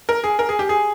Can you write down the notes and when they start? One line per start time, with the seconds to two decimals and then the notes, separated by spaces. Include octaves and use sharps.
0.09 A#4
0.24 G#4
0.39 A#4
0.49 G#4
0.59 G4
0.69 G#4